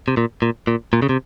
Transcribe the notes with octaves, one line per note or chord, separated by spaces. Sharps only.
C3
A#2
A#2
A#2
A#2
C#3
C3